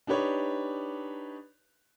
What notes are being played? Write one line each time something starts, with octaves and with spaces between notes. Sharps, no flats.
D4 D#4 G4 B4 C#5